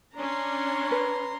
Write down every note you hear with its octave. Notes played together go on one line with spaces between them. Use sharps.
C#4 D4 A#5 C6
B4